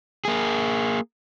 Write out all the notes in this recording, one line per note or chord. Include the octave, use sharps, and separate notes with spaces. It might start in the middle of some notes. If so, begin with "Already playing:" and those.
A#3 G#4